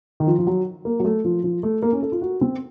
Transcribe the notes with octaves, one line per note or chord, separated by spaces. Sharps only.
D#3
F3
F3
F#3
A#3
F#3
A3
F3
F3
A3
A#3
C#4
A4
F4
F#4
C4